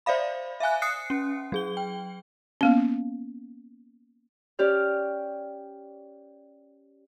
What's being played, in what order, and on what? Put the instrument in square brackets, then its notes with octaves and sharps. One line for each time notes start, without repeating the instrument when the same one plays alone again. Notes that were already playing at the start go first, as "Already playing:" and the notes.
[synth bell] C5 D5 E5 F5 B5
E5 F5 G#5 F#6
D#6 F#6 C7 C#7
C#4
F#3 G#4 G7
G5
[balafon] A#3 B3 C#4
[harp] C#4 G4 D5 F6